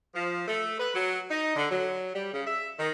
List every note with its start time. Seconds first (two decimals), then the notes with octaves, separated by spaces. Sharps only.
0.15 F3
0.47 A3
0.80 B4
0.94 F#3
1.31 D#4
1.55 D3
1.71 F#3
2.14 G3
2.34 C#3
2.47 E5
2.79 D#3